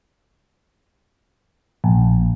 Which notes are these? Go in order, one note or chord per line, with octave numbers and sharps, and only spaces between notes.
A#1